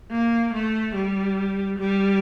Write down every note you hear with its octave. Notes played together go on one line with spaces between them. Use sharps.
A#3
A3
G3
G3